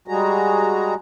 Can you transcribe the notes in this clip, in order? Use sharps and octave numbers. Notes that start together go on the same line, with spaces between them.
G3 G#3 F#4 G#4 A#5